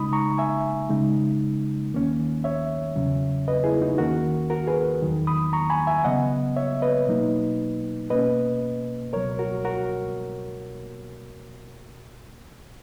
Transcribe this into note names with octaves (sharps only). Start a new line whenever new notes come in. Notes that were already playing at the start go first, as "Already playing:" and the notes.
Already playing: C#3 G#3 D#4 B5 D#6
A#5 C#6
E5 G#5
C#3 G#3 D#4
D#2 D#3 A#3 C#4
C#5 E5
E2 C#3 F#3 C#4
B4 D#5
E4 G#4
D#4 F#4
D#2 D#3 A#3 C#4 F#4 A#4
F#4 A#4
G#4 B4
E2 D#3 F#3
B5 D#6
A#5 C#6
G#5 B5
E5 G#5
C#3 F#3 B3 D#5 F#5
C#5 E5
B4 D#5
B2 F#3 A#3 D#4
B2 A#3 C#4 B4 D#5
C#2 B2 F#3 A#4 C#5
F#4 A#4
F#4 A#4